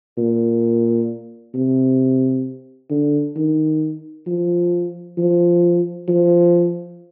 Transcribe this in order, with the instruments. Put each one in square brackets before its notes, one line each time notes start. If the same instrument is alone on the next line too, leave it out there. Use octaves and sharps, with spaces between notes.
[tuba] A#2
C3
D3
D#3
F3
F3
F3